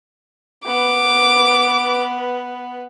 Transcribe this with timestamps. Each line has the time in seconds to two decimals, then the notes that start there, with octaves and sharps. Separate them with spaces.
0.66 B3 B4 D6